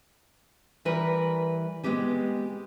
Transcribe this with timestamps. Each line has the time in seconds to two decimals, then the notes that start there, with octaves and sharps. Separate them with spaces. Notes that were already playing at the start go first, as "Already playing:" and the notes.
0.85 E3 G3 A#4 B4
1.84 G#3 A3 B3 C4 G4 G#4